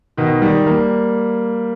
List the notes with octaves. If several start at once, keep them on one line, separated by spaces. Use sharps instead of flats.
B2 D#3
D#3 G3
G3 A#3